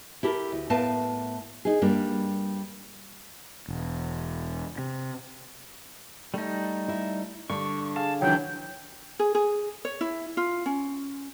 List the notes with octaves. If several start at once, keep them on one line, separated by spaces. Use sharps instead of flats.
E4 G4 A4 A#4
D2
A2 A3 B3 A#4 F5 A5
D#4 G#4
G2 G3 A#3 D4
E1
C3
G3 A3 D#4
E4 E5
G2 D3 C#6
G#4 F5 A5
C#2 D#3 E3 F#3 D4 G5
G#4
G#4
C#5
E4
F4
C#4